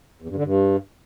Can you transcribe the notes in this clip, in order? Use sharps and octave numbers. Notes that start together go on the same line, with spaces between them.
E2
G2
D3
G2